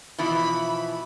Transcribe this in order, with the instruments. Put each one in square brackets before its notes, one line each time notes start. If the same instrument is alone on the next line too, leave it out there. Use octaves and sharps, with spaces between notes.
[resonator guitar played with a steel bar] B2 E3 E4 [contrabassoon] F3 [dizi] B5